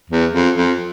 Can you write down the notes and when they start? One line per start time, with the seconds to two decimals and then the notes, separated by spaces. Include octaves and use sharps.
0.09 E2
0.33 F2
0.55 F2